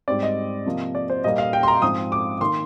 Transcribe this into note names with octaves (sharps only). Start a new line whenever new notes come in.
G#2 G3 C4 D5
D#5
C3 F3 A#3
D5
C5
A#2 G3 A#3 D#5
F5
G5
C6
A#5
G#2 F3 C4 D#6
D6
D#3 A#3 C6